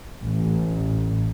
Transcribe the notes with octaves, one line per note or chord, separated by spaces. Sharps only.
A1